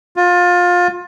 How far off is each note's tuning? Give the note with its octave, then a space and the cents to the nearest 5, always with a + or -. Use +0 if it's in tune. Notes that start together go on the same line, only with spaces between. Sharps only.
F4 +25